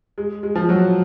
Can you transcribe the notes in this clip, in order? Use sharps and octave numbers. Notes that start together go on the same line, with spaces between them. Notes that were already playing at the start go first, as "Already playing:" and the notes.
G#3
G#3
F3
F#3